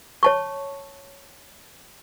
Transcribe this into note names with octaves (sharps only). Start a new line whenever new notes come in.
C#5 A5 C#6